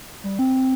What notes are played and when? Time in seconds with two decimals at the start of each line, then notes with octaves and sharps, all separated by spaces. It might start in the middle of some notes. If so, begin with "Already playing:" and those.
0.24 G3
0.39 C4